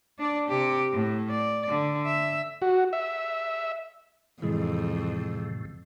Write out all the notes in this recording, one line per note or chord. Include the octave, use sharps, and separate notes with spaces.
D4 D5
C3 G4
A2
D5
D3
E5
F#4
E5
F2 A2 C3 E3 G#3